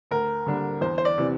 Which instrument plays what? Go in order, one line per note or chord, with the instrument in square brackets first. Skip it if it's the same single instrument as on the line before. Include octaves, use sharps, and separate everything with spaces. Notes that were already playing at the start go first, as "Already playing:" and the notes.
[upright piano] D2 [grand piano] A#4
[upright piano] D3 G3 A#3 D4
[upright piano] E2 [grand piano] C5
[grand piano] C5
D5
[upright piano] C3 E3